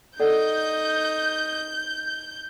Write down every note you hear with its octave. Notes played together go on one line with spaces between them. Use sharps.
D#4 A4 D5 D#5 F#5 G6